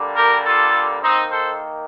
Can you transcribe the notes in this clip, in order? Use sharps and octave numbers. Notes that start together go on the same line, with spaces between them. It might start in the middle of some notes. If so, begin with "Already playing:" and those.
Already playing: D3 G3 A#3
G4 A#4
F4 A4
D#3 A#3 C4 D#4
A4 C5